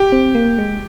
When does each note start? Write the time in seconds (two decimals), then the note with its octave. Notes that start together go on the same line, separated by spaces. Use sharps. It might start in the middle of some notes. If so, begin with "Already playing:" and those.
Already playing: G4
0.12 C4
0.35 A#3
0.58 G#3